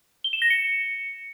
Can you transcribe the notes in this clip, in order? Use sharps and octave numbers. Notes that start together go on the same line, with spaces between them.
G7
E7
A#6
C#7